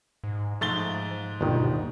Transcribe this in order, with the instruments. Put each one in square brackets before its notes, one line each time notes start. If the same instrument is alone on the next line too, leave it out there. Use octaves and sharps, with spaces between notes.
[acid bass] G#2
[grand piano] G#2 A6 G7 [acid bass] F3 [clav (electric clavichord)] A3
[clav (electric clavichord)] G1 D#3 [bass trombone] D#2 [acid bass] B2